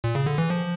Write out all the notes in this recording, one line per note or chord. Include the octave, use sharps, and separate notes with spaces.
A#2
C#3
D3
E3
F3